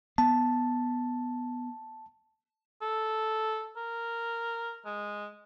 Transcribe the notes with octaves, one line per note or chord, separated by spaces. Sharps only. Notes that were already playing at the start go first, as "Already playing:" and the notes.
B3 A5
A4
A#4
G#3